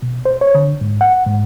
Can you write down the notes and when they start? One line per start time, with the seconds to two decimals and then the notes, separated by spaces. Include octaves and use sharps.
0.02 B2
0.25 C5
0.41 C#5
0.55 D3
0.81 G#2
1.01 F#5
1.26 G#2